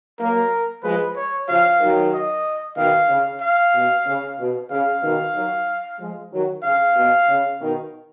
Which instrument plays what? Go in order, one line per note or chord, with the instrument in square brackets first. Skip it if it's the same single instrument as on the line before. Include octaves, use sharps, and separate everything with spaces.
[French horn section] F#3 A#3 [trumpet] A#4
[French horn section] F3 G#3 [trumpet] B4
[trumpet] C#5
[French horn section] C#3 F3 [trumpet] F5
[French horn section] D#3 F#3
[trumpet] D#5
[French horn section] B2 D#3 [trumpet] F5
[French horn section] C#3
[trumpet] F5
[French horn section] B2
C#3
B2
[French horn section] C#3 [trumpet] F5
[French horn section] B2 D#3
D#3 F#3
F3 G#3
D#3 F#3
[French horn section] C#3 [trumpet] F5
[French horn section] B2
C#3
B2 D#3